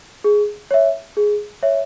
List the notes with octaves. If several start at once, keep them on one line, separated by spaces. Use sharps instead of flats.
G#4
C#5 E5
G#4
C#5 E5